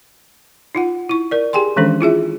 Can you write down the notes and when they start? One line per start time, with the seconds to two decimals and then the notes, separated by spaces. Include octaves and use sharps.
0.75 D#4 F4 F#5
1.09 E4 C#6
1.31 A#4 D5
1.53 G4 G#4 G5 G#5 C6
1.76 D#3 E3 G#3 C#4 D4 A4
2.01 E4 F4 G#4 E5